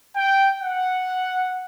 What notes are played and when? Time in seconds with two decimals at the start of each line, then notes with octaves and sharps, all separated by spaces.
0.16 G5
0.61 F#5